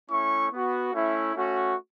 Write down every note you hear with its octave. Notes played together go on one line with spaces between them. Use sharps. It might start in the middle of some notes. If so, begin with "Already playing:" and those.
A3 C#4 E4 C#6
B3 F#4
A3 C#4 E4
A3 C#4 F#4